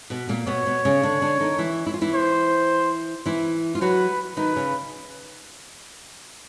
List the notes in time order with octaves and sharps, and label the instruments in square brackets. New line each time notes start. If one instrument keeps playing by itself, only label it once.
[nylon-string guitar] B2 B3
A#2 A#3
[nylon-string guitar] B2 B3 [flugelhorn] C#5
[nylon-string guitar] B2 B3
C#3 C#4
D3 D4
D3 D4
D#3 D#4
E3 E4
E4
F4
E3 E4
[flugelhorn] C5
[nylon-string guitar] E3 E4
F4
[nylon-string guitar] F#3 F#4 [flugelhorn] B4
[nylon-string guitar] D#3 D#4 [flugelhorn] B4
[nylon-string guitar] C#3 C#4